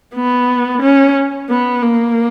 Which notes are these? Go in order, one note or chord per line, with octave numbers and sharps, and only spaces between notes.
B3
C#4
B3
A#3